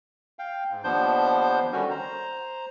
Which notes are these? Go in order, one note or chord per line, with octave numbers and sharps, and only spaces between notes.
F5 G5
G#2
D#2 F3 B3 D4 C5 G6
D3 D#3 G3 C#4 F#4
C5 A#5